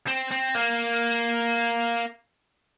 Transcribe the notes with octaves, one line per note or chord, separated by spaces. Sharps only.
C4
C4
A#3